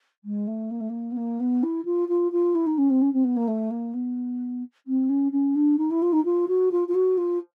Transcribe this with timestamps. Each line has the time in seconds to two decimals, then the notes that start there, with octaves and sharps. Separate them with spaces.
0.24 G#3
0.47 A3
0.70 A#3
0.80 A3
0.89 A#3
1.11 B3
1.16 A#3
1.39 B3
1.63 E4
1.85 F4
2.08 F4
2.32 F4
2.55 E4
2.66 D#4
2.77 C#4
2.89 C4
3.01 C#4
3.13 C4
3.24 B3
3.36 A#3
3.47 A3
3.70 A#3
3.93 B3
4.86 C4
5.09 C#4
5.31 C#4
5.55 D4
5.78 D#4
5.90 E4
6.02 F4
6.12 D#4
6.24 F4
6.48 F#4
6.71 F4
6.88 F4
6.94 F#4
7.17 F4